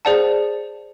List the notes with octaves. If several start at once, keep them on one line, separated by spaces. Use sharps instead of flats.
G#4 C5 D5 F#5 A5